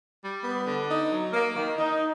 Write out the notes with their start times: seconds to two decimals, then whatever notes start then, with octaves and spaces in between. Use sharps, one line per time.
0.22 G3
0.44 B3
0.66 D3
0.89 D#4
1.11 F#3
1.34 A#3
1.56 D#3
1.78 D#4